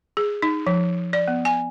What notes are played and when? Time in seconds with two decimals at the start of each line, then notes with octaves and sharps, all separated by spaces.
0.17 G#4
0.42 D#4
0.67 F3
1.13 D5
1.28 B3
1.45 G#5